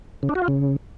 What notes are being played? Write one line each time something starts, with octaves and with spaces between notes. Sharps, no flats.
C#3
D4
F#4
F4
C#3